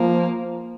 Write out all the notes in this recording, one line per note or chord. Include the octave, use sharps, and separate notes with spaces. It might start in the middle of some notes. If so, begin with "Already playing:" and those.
Already playing: F3 A#3